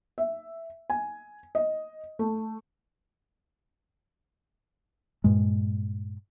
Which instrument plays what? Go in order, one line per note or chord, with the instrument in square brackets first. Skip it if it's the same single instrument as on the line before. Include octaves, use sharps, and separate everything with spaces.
[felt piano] E5
G#5
D#5
A3
[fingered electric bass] G2 A#2 G#3